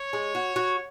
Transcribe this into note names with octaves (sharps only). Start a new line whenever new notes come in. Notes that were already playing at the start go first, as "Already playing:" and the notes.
Already playing: C#5
G#3
F#4
F#4